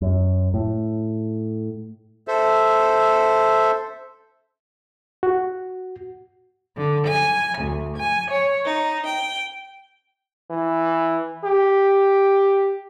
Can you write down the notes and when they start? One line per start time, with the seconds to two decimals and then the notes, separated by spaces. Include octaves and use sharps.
0.02 F#2
0.54 A2
2.28 A4 C5 E5
5.23 F#4
6.75 D3
7.05 G#5
7.59 D2
7.97 G#5
8.30 C#5
8.66 D#4
9.06 G5
10.51 E3
11.45 G4